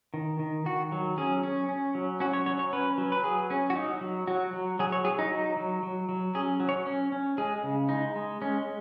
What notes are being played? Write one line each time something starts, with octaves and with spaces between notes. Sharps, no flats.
D#3
D#3
D#3 F#4
F#3
C#4 G#4
C#4
C#4
F#3
C#4 F#4
C#5
F#3 C#5
C#5
C#4 B4
F#3
B4
F#3 G#4
C#4
F#4
F#3 D#4
F#3
F#3 F#4
F#3
F#3 G#4
C#5
F#3 G#4
D#4
F#3
F#3
F#3
F#3
C#4 G#4
F#3
C#5
C#4
C#4
G#3 G#4
C#3
G#3 D#4
G#3
G#3 C#4